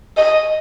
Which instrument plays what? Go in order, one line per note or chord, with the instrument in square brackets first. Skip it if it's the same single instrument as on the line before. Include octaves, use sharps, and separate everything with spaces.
[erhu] D#5